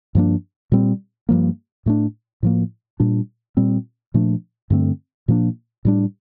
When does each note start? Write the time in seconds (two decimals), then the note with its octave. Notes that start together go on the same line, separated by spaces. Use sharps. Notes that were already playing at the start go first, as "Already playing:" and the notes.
0.15 G2 F3 A#3 D4
0.72 A#2 G3 C4
1.29 G2 F3 A#3
1.86 A2 A3 D4
2.43 A2 F3 A#3
3.00 A#2 G3 D4
3.57 A#2 G3 C4
4.14 A#2 F3 A3 D4
4.70 G2 D3 A3 C4
5.28 A#2 F3 A#3 D4
5.85 A2 G3 D4